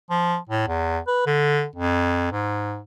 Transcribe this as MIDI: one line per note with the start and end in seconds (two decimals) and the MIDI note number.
0.10 0.36 53
0.49 0.67 45
0.68 0.99 40
1.07 1.23 71
1.26 1.65 50
1.76 2.31 41
2.32 2.80 44